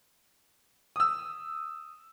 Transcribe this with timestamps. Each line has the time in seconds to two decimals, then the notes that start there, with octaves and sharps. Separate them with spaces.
0.96 D#6 E6